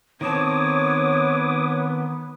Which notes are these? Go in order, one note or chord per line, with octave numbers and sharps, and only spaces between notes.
D#3 B3 C4 C#5 A5 D6 D#6